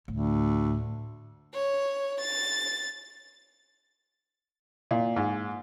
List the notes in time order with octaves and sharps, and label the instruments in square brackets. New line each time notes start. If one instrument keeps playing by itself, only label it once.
[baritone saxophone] D2 [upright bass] A2
[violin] C#5
A6
[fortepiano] A#2
G#2